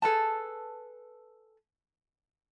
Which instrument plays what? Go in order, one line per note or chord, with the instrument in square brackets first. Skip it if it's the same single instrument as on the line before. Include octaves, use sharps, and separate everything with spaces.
[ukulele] G#4 A4 B4 A5